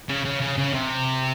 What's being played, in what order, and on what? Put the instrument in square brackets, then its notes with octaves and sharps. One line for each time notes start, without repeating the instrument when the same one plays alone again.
[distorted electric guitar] C#3
C#3
C#3
C#3
C3